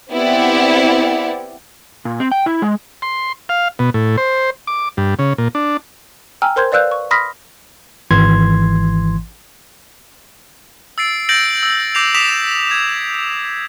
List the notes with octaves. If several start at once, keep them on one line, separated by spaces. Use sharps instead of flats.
B3 C4 E4 G4 D5 F#5
A#2
C4
G5
E4
G#3
C6
F5
B2
A2
C5
D6
G2
C#3
A#2
D4
G5 G#5 A#5 E6 F6
A#4 C5 C6 G6 G#6
B4 D5 F5 E6 F#6 G6
C#6
B5 C6 D#6 F6 A#6 B6
G#1 E3 C6 G#6
E6 A6 C7 D7
G6 A6 A#6 D7 F#7
E6
D6 G6 A#6 C7 F7
D6 D#6 B6 E7 F7
G#6